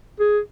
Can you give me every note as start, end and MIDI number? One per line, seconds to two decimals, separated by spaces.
0.20 0.39 68